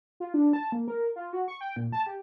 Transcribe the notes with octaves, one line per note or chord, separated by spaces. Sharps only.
F4
D4
A5
A#3
A#4
F4
F#4
C#6
G5
A#2
A5
G4